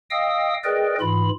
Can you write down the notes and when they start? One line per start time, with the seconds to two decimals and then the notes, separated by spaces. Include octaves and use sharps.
0.10 D#5 F5 G5 D#6 E6
0.64 G#4 A#4 B4 D5 D#5 G5
1.01 G#2 E3 F4 B5